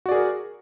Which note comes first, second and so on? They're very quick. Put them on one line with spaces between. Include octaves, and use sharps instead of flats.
F#4 D5 G#4 A#4